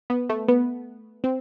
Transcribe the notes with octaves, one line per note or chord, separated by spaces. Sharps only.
B3
A3
B3
C4